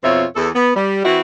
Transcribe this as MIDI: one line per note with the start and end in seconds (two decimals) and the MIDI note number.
0.04 0.25 41
0.04 0.25 47
0.04 0.25 60
0.04 0.25 65
0.04 0.25 73
0.04 0.25 76
0.36 0.48 40
0.36 0.48 69
0.55 0.71 59
0.75 1.03 55
1.04 1.21 52
1.04 1.21 60
1.04 1.21 64
1.04 1.21 66